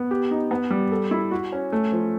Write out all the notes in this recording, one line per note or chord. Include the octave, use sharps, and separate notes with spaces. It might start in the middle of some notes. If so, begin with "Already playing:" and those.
Already playing: B3
G4
D#4
B3
G3
A4
E4
F#4
C#4
A3
F3